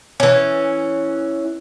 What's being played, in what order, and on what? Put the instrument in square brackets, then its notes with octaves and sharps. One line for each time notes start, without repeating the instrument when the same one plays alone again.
[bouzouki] E3 C#4